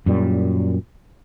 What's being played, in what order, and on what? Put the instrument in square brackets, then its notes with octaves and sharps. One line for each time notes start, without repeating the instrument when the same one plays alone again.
[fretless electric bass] F#2 A#2 G3